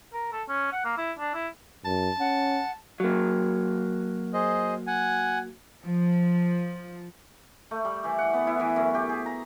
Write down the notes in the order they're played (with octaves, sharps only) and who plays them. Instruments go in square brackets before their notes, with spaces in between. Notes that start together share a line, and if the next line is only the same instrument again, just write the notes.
[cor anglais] A#4
A4
C#4
F#5
A#3
E4
D4
E4
[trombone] F#2 [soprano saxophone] A5
[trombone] C#4 [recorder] F#5
[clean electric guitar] F#3 A#3
[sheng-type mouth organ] G#4 C5 D#5
F#5 G#5
[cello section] F3
[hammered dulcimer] A3
G3
E3
F#5
B3
E4
E3
F#2
G4
G#4
A#5